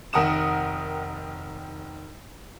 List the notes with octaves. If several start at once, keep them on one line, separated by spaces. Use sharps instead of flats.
F1 D#3 A#4 F#5 D#6 E7